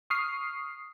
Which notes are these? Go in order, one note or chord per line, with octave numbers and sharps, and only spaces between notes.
C#6 D#6 F6 C7